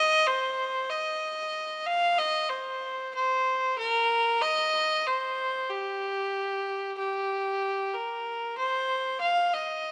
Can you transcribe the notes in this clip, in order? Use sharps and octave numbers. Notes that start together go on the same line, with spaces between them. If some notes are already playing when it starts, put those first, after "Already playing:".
Already playing: D#5
C5
D#5
F5
D#5
C5
C5
A#4
D#5
C5
G4
G4
A#4
C5
F5
D#5